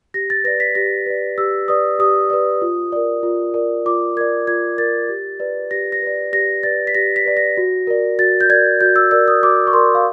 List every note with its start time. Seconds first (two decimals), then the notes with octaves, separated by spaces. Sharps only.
0.14 G4 A#6
0.30 A6
0.44 B4 D5 A#6
0.60 B6
0.75 G4 A#6
1.06 B4 D5
1.38 G4 E6
1.68 B4 D5 D#6
1.99 G4 D#6
2.30 B4 D5
2.62 F4
2.92 A#4 D5
3.23 F4
3.54 A#4 D5
3.86 F4 D6
4.17 A#4 D5 G#6
4.47 F4 G#6
4.78 A#4 D5 A6
5.09 G4
5.40 B4 D5
5.71 G4 A#6
5.92 A#6
6.02 B4 D5
6.33 G4 A#6
6.63 B4 D5 A6
6.87 B6
6.95 G4 A#6
7.16 B6
7.25 B4 D5
7.37 A#6
7.57 F#4
7.87 A#4 D5
8.19 F#4 A6
8.41 G6
8.49 A#4 D5 G#6
8.81 F#4 G6
8.96 E6
9.11 A#4 D5 E6
9.28 D#6
9.43 F#4 D6
9.67 C#6
9.73 A#4 D5 C6
9.95 F5